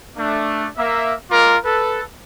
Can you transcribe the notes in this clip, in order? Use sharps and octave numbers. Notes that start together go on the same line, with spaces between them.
A3 D4
A#3 E5
G#3 F4 A#4 D6
A4 B4